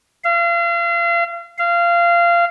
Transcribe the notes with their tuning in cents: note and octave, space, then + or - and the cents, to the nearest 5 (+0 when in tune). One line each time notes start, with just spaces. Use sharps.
F5 -35
F5 -20